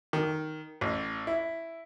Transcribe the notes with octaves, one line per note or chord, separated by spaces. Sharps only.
D#3
A1
E4